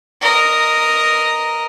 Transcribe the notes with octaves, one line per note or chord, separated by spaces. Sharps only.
A#4 D#5